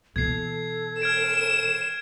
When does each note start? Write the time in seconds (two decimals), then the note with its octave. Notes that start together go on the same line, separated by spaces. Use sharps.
0.16 B2 E3 A4 G#6 C7
1.02 F6 G#6 D7 E7